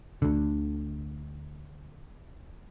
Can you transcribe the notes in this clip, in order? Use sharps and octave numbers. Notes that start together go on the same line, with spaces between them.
D2 D3